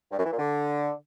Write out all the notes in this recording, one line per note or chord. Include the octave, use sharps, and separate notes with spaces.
G2
F#2
E3
A#2
D3